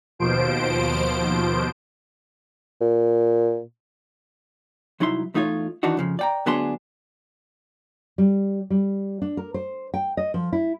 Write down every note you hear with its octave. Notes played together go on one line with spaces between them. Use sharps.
D#2 B2 F3 C5 D7
A#2
C2 F#3 D#4 E4 C6
E2 A3 D#4 F4 C#5
D#3 E3 D4 D#4 F#4
F2 C#3 F3
D5 G5 A#5
D2 F#3 B3 D4 G#4 C6
G3
G3
D4
A#4
C5
G5
D#5
F3
E4